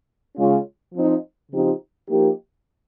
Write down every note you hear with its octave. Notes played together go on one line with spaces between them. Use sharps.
C#3 G#3 C#4 F4
F3 C4 D#4
C#3 F3 C4 D#4 G4
F3 A#3 D#4 G4